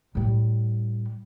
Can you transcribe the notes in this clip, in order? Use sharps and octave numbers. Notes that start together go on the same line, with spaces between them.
A2 G3